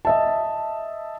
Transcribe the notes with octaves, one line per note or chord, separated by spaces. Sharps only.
D#5 E5 A5